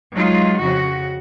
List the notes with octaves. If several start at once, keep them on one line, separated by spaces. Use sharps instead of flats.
F#3 G#3 D#4 F4
F2 C#3 F#4